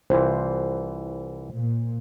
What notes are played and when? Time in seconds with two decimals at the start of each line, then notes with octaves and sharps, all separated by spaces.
0.10 C2 E3 F4 C5
1.53 A#2